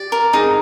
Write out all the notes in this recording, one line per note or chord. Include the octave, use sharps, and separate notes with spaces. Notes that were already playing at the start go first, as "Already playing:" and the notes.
Already playing: G4 D5
A#4
D#4 G#4